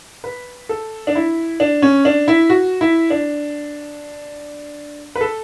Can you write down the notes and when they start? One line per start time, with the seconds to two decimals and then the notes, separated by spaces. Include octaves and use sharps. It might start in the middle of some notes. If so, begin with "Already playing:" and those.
0.24 B4
0.69 A4
1.07 D4
1.15 E4
1.60 D4
1.82 C#4
2.05 D4
2.28 E4
2.50 F#4
2.81 E4
3.10 D4
5.15 B4
5.21 A4